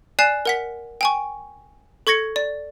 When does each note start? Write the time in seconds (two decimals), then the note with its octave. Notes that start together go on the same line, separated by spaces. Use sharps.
0.19 D5 G#5 F#6 C7 E7
0.45 A#4 F#5 B6
1.01 G5 G#5 C#6
2.07 A4 C#6 G#6 A#6 C#7
2.36 D5